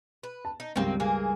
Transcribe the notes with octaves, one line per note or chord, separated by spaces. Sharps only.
B4
A5
D#4
C#2 G2 D#3 A#3 C4
E3 A#3 G#4